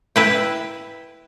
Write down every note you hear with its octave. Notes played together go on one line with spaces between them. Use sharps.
E4 B4 G5